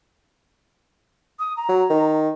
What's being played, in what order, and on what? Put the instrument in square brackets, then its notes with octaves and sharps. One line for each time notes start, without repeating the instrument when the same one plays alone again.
[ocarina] D#6
A#5
[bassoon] F#3
D#3